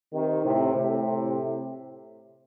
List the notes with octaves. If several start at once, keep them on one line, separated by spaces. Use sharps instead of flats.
C3 D#3
A2 C3
A2 C3